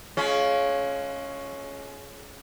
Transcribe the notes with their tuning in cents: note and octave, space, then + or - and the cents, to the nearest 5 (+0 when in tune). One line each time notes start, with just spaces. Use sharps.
G#3 +30 C#4 +0 F4 +0